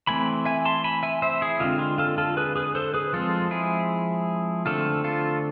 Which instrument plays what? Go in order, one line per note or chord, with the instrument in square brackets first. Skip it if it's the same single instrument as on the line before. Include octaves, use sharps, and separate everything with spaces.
[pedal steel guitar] E3 A3 C4 G#5 B5
E5 G#5
A5 C6
G#5 B5
E5 G#5
C5 E5
E4 G#4
D3 G#3 C4 F4
F4
F4 A4
F4 A4
G#4 B4
G#4 B4
A4 C5
G#4 B4
F3 G#3 C4 F4 A4
E4 G#4
D3 A3 C4 F4 A4
F4 A4